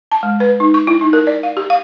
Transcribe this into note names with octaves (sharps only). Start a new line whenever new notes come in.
A5
G#3
B4
D#4
C#6
E4
D#4
A#4
D5
F5
G4
F5